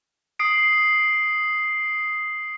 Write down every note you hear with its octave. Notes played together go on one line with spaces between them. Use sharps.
D#6 C7 D7